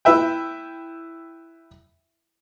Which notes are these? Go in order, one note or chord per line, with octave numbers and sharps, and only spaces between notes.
E4 B4 E5 G5